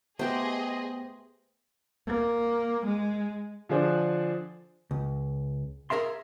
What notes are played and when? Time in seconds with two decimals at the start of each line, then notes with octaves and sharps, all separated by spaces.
0.19 A3 B3 G4 G#4 B4 C5 D#5 G5
2.07 A#3
2.86 G#3
3.69 D3 F3 D4 G#4 C5
4.91 C#2
5.90 G#4 A#4 E5 F5 C6